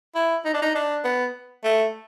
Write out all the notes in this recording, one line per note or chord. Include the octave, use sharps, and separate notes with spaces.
E4
D#4
D4
D#4
D4
B3
A3